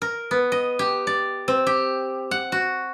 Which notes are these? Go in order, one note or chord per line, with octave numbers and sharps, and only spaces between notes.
A#4
B3
D#5
G4
D5
C4
G4
F#5
F#4